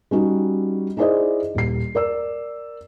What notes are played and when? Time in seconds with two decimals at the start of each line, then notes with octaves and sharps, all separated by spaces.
0.11 G3 C#4 D#4 F#4
0.97 D#4 E4 G#4 C5 D5 D#5
1.55 D#1 C7
1.95 A#4 D5 E6